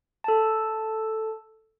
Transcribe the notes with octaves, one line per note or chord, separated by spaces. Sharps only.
A4 A5